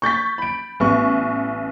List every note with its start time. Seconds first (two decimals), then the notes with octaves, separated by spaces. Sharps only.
0.02 C#6 G6 A6 B6
0.38 B5 D7
0.80 A1 B3 C#6